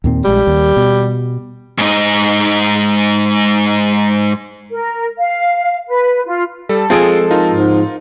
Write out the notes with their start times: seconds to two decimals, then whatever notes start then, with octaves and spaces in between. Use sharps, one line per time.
0.04 D#2 A#2 C4
0.25 A#1 G3 G#3
0.47 D#2
0.77 B2
1.78 G#2 D#4
4.71 A#4
5.18 F5
5.87 B4
6.26 F4
6.69 G3 A4
6.90 F3 G#3 C4 F4 G#4 D7
7.31 D#4 F4 A#4
7.51 G#2